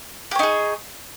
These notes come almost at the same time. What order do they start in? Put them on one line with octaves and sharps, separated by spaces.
G4 C#5 D#4 G#4